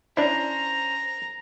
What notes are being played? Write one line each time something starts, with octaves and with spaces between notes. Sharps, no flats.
C#4 D4 E4 C5 A#5